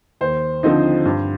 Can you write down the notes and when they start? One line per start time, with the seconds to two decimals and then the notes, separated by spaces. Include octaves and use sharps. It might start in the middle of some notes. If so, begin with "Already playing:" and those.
0.21 D#2 C5
0.63 D3 F3 C4 D#4
1.05 G2